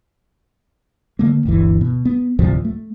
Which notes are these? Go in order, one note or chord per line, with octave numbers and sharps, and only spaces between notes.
D3 A3 A#3
G1 D2 E3
B2
B3
D2 A2 C3 F3
A3